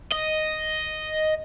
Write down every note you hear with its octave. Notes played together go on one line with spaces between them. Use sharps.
D#5